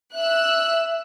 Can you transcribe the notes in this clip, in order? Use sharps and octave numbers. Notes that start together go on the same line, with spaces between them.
E5 E6 F#6